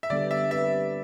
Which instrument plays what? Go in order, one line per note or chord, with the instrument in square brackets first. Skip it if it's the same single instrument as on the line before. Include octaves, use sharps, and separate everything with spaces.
[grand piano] E5
[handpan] D3 G3 B3 D4 A4 [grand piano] D5
[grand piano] E5
[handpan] G3 C4 G4 B4 [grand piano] E5